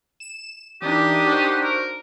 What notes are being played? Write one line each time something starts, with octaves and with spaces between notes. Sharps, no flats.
E7
E3 D4 D#4 G4 A#4 D#6
F#4 C5
A#4